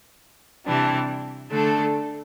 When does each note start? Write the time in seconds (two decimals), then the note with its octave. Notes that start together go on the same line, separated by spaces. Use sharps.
0.65 C3 E3 G3 D4
1.50 D3 A3 D4 A4